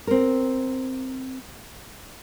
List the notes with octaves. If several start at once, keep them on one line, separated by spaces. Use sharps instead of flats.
C4 A#4